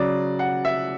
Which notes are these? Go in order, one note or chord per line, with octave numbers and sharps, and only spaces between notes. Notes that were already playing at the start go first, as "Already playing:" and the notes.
Already playing: C#3 F#3 D5
F#5
E5